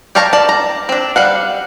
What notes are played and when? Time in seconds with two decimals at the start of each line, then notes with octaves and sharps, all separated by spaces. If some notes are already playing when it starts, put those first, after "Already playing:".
0.15 G4 C#5 F5 A5 A#5
0.33 D5 A5
0.49 A#5
0.89 C4 D4
1.16 G3 F5 F#5